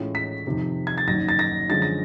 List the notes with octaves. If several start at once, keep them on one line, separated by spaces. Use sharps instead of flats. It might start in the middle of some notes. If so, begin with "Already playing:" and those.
Already playing: A2 E3 G#3 C#4 F4
B6
F2 C3 D#3
G#6
A6
F#1 F#2 D#3 A#6
A6
A#6
F#2 D3 F3 G#3 A6
A#6